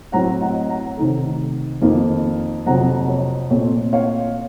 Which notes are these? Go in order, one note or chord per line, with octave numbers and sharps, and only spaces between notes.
A2 F#3 C4 F#5 A#5
D#5 F#5
F#5 A#5
C3 D#3 A3
F2 D#3 A#3
F2 C3 F#3 F#5 A#5
C#5
A#2 A3 C4 C#5
C#5 F5